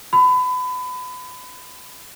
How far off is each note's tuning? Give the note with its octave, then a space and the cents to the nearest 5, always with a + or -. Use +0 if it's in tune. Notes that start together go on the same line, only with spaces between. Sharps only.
B5 +30